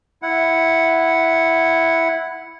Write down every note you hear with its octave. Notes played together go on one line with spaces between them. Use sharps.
E4 F#5